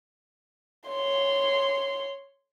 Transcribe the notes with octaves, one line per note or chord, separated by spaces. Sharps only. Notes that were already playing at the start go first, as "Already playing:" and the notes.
C#5 C6